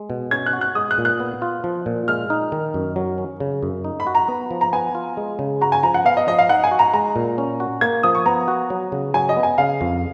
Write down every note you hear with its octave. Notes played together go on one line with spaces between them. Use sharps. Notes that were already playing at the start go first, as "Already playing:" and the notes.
Already playing: G#3
B2
C#4 G#6
F#6
F#4
F#6
G#3 D#6
F#6
A#2
F#6
B3
F4
F3
A#2
G#3 F6
D#4
D#3
F#2
F#3
C#4
C#3
F#2
D#4
B5
F#4
A#5
B3
F3
A#5
B3 G#5
F4
G#3
C#3
F#4 A#5
G#5
F3 A#5
F#5
B3 F5
D#5
F3 D#5
F5
D#4 F#5
G#5
F#4
A#5
G#3 A#5
A#2
C#4
F#4
A#3 G#6
F3 D#6
C#6
B3 A#5
F#4
F#3
C#3
F#3 G#5
D#5
B3
G#5
C#3 F5
F2